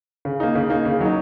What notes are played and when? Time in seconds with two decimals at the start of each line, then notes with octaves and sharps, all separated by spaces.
0.25 C#3
0.40 A#3 D#4
0.55 C#3
0.70 A#3 D#4
0.85 C#3
1.00 F#3 D#4